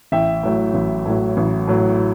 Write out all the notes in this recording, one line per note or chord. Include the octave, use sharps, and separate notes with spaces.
A1 E5 G5
A2 F#3
A1
A2 F#3
A1
A2 F#3